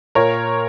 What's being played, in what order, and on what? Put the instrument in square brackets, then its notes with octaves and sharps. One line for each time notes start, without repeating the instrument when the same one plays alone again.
[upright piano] A#2 A#4 C#5